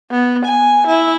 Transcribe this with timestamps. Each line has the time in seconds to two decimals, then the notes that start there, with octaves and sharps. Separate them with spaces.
0.11 B3
0.45 G#5
0.87 E4